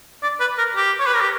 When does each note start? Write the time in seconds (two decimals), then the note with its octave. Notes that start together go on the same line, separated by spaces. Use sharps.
0.23 D5
0.40 B4
0.58 A#4
0.76 G4
0.99 C#5
1.07 B4
1.14 A#4
1.21 G4